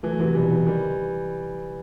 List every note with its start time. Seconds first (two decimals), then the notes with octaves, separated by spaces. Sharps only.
0.03 E3 A3
0.12 F#3
0.20 E2 C3 E3
0.35 B2 E3 G3
0.51 E2
0.66 D#3 E3 G3